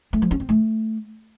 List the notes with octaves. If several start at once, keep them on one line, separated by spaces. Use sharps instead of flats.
A3
F3
C#4
C4
A3